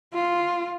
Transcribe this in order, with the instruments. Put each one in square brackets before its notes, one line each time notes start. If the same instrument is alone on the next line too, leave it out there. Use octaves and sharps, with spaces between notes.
[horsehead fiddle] F4